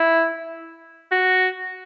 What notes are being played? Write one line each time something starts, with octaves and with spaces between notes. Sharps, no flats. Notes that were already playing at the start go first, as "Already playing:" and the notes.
Already playing: E4
F#4